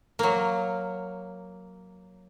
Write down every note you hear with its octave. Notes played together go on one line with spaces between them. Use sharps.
F#3 A#3